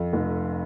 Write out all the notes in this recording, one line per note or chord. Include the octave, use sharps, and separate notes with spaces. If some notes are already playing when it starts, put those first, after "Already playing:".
Already playing: F2
F1